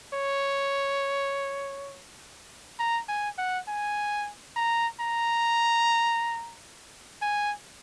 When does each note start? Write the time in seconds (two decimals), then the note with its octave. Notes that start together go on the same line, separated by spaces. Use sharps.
0.14 C#5
2.79 A#5
3.08 G#5
3.38 F#5
3.68 G#5
4.56 A#5
5.00 A#5
7.22 G#5